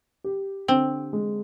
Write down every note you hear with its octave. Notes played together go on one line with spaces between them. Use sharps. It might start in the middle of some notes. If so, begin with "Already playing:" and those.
G4
D3 C4
G#3